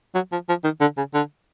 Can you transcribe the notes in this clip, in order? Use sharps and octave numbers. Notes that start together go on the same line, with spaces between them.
F#3
F3
F3
D#3
D3
C#3
D3